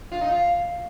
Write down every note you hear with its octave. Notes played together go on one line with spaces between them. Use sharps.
F4
D#4
F4